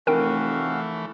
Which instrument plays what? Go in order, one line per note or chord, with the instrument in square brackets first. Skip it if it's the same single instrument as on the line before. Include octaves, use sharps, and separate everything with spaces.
[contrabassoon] F1 [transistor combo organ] E3 A3 [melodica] C#4 F#4 F5 [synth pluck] A#4 G5